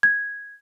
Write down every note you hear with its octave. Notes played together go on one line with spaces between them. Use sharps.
G#6